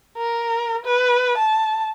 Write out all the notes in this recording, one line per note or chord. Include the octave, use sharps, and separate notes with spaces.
A#4
B4
A5